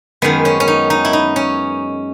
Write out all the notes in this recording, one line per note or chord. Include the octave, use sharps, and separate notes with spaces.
F#2 D#3 G#3 B3
C#4
C#4
D#4
D#4
E4
D#4
C#4